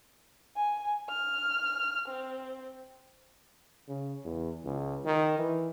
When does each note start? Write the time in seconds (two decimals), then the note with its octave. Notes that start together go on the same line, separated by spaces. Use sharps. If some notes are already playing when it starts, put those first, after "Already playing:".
0.57 G#5
1.09 F6
2.08 C4
3.88 C#3
4.24 E2
4.64 C#2
5.05 D#3
5.38 E3